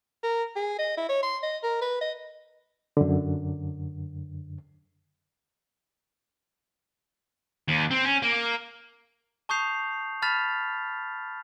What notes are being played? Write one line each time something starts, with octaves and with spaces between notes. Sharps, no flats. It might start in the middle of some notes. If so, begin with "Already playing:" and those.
A#4
G#4
D#5
E4
C#5
C6
D#5
A#4
B4
D#5
F#2 D3
D#2
C4
C#4
A#3
A5 C#6 D#6 G6 C7 F7
A5 B5 F6 A6 B6 F7